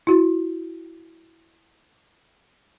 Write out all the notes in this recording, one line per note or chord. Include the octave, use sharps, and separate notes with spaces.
E4 F#4